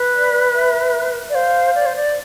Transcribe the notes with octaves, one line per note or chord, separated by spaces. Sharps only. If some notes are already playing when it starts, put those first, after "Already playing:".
Already playing: B4
D5
E5
D5
C5 F5
D5
C5
D5